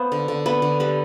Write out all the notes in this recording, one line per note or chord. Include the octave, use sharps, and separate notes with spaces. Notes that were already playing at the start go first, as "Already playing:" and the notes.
Already playing: B3 C5 F5
D3
D3
B3 B4
D3
G3 B4